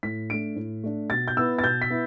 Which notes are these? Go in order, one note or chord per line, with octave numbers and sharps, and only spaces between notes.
A2 B6
A3 D4 D7
A2
A3 D4
B2 A6
G6
B3 E4 E6
A6
B2 G6
B6
B3 E4